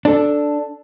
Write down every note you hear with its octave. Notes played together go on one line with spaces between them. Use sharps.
D4 A4